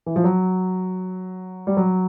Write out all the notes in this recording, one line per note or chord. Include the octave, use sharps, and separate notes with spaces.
E3
F3
F#3
G3
F#3